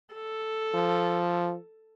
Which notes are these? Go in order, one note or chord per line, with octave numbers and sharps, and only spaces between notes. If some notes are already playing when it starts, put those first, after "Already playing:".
A4
F3